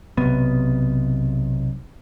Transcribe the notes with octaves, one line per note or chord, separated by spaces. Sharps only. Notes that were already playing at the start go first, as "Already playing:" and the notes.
B1 C3 B3